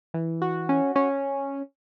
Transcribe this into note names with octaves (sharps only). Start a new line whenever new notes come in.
E3
F#4
C#4
C#4